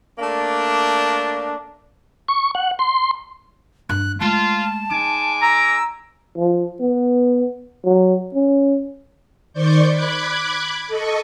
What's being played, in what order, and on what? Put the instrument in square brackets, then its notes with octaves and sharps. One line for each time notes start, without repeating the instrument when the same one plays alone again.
[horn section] A3 A#3 D4
[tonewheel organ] C#6
F#5
C6
[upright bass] G2 [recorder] F#6
[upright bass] G#3 A3 [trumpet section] F4 [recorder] A5
[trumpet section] G#3 G#5 D6 [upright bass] D#4
[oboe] A#5 [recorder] E6
[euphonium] F3
B3
F#3
C#4
[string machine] D#3 C5 D5 C#6 G6
B5 D6 F#6 G#6
A4 D#5 C#6